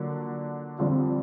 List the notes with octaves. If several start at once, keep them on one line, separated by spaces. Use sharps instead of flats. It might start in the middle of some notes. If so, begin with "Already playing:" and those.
Already playing: D3 F#3 A#3 D4 F4
F2 D3 G3 C4 F4